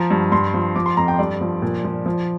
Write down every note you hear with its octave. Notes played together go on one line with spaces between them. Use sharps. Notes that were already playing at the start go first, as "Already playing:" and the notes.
Already playing: F3 A#5
G2
G2 C6
F3
F3 D6
C6
F2 A#5
G5
G2 D5
F3
A#2
F3
F3